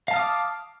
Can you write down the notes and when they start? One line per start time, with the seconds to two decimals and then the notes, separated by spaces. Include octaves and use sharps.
0.08 F5
0.11 A5
0.14 F6
0.16 D#6
0.19 D6